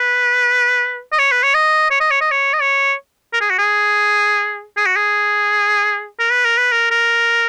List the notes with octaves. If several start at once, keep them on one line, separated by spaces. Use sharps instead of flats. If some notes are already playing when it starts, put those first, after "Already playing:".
Already playing: B4
D#5
C#5
B4
C#5
D#5
C#5
D#5
C#5
D#5
C#5
D#5
C#5
A#4
G#4
F#4
G#4
G#4
F#4
G#4
A#4
B4
A#4
B4
A#4
A#4